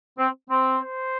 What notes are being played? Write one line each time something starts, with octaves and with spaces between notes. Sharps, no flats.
C4
C4
C5